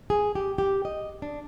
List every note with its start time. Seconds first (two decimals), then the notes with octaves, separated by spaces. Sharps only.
0.10 G#4
0.35 G4
0.58 G4
0.85 D#5
1.22 D4